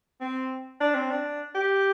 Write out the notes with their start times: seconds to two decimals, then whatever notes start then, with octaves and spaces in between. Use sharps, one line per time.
0.21 C4
0.80 D4
0.95 C4
1.11 D4
1.55 G4